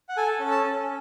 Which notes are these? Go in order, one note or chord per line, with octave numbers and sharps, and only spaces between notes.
F#5
A4 G#5
C#4
A5
C#4